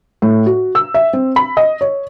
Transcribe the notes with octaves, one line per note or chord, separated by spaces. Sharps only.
A2
F#4
E6
E5
C4
B5
D#5
C#5